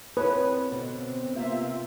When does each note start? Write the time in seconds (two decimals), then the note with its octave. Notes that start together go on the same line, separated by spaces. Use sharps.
0.17 B3 C4 E4 B4 C#5
0.71 B2 D3 B3 F#4
1.35 C3 A#3 F4 G4 E5